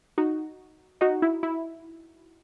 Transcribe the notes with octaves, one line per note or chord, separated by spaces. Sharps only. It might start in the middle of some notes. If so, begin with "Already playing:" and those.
D#4 F#4
D#4 F#4
E4
E4